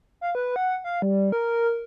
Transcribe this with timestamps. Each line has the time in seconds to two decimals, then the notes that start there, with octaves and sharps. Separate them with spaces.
0.21 F5
0.35 B4
0.56 F#5
0.84 F5
1.02 G3
1.32 A#4